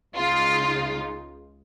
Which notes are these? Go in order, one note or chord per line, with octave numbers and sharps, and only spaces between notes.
C#2 C#3 G#3 D#4 F4